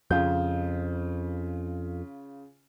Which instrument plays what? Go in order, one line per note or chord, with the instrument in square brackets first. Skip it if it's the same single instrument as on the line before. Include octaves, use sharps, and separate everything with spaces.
[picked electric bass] F2 [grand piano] C#3 F4 G6